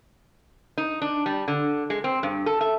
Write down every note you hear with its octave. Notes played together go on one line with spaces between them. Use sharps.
D#4
D4
G3
D3
G#3
C4
G2
A4
E5